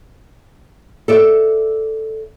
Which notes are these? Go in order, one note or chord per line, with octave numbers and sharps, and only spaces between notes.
A4 D5 E5